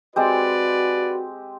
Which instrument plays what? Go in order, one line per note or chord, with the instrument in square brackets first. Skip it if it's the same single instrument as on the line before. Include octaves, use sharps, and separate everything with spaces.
[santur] G#3 C4 G4 [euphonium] F#4 [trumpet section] B4 D5